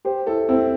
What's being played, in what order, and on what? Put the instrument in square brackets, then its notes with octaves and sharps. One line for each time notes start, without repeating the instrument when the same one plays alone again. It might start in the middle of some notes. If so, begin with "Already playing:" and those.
[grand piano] G4 C5
E4 A4
C4 E4